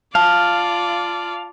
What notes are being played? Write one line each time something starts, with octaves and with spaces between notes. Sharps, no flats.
F4 D5 F5 A5